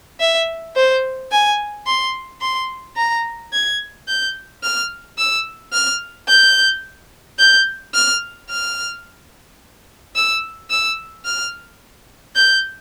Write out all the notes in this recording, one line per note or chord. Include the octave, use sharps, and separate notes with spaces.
E5
C5
G#5
C6
C6
A#5
G#6
G6
F6
E6
F6
G6
G6
F6
F6
E6
E6
F6
G6